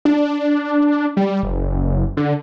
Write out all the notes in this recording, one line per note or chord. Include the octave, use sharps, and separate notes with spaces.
D4
G3
F#1
D3